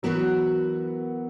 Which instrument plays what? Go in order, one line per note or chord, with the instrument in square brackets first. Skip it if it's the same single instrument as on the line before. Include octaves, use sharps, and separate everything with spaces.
[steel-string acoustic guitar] E3 B3 F#4 A#4 [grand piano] F#3